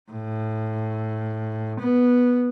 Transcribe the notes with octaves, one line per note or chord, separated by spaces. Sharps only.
A2
B3